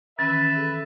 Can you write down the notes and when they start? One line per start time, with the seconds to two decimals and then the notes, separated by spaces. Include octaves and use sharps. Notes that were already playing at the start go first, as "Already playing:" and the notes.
0.19 D#3 E3 C#4 B4 E5 A6
0.56 G#4 A4